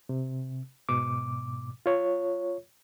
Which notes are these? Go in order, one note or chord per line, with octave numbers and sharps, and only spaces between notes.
C3
G#2 B2 D6
F4 C#5